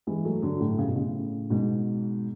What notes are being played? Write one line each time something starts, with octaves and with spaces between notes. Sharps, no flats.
E3 G#3
F#3 A3
D3 F#3
A2
C#3
B2
A2 C#3
G#2 B2